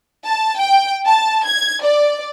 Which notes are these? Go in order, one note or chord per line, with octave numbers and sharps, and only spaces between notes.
A5
G5
A5
G#6
D5